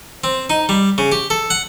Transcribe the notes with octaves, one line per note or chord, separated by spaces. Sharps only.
C4
D#4
G3
C#3
G4
A4
F#5